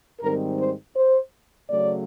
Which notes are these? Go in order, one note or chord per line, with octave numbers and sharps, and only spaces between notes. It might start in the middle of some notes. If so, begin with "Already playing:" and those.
G#2 D#3 G3 C4 A#4
C5
C5
C#3 F#3 A3 C#4 D5